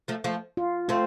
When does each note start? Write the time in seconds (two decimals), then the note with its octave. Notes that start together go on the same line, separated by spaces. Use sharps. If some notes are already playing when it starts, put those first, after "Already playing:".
0.08 F3 A3
0.24 F3 A3
0.57 F4
0.89 A3 C4 F4